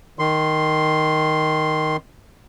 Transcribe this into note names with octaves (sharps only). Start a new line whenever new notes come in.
D#3 C6